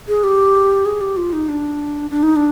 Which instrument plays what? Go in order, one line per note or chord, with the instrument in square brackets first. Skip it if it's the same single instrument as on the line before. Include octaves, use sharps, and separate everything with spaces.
[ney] G#4
G4
G#4
G4
F4
D#4
D4
D4
D#4
D4